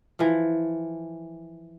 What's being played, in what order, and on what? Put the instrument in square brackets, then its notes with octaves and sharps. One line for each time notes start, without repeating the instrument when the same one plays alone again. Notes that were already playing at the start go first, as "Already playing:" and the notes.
[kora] E3 F3